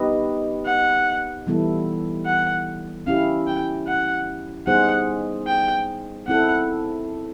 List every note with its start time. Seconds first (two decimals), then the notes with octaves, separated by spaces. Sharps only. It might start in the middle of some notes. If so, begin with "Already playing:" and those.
Already playing: B3 D#4 G4 B4 D#5
0.66 F#5
1.47 E3 G3 B3 E4 A4
2.26 F#5
3.07 C#4 E4 G4 F5
3.47 G5
3.88 F#5
4.67 G3 B3 D#4 G#4 C5 F#5
5.47 G5
6.27 C4 E4 A4 F#5